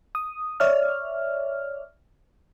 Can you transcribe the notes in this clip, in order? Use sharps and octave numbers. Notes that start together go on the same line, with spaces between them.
D#6
C#5 D5 E5 F6